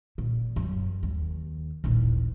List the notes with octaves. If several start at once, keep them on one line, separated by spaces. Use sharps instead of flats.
A#2
F#2
D#2
D#1 A1